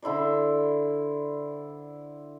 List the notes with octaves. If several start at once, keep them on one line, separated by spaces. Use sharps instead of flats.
D3 E4 C5 D5